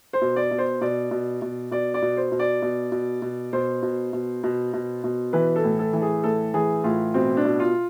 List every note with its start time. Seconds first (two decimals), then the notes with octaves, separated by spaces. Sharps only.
0.13 C5
0.22 B2
0.36 D5
0.51 B2
0.58 C5
0.81 B2 D5
1.11 B2
1.42 B2
1.71 B2 D5
1.94 D5
2.02 B2
2.17 C5
2.32 B2
2.39 D5
2.62 B2
2.92 B2
3.22 B2
3.53 B2 C5
3.83 B2
4.13 B2
4.44 B2
4.73 B2
5.04 B2
5.33 E3 B4
5.56 A4
5.64 A2
5.79 A4
5.93 E3
6.02 G#4
6.24 A2 A4
6.54 E3 G#4
6.84 A2 F4
7.14 B2 C4
7.37 D4
7.45 B2
7.60 F4